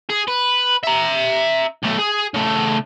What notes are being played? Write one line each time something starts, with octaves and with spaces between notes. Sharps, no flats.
G#4
B4
E5 A#5
B1 A3
G#4
C#3 A3